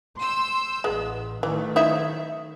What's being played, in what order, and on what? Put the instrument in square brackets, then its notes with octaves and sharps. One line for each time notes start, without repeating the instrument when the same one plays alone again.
[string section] C6 E6 G6
[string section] A1 [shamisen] G#3 B3
[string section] D#3 F#3 A3 [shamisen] E3
[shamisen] D#4 E4 E5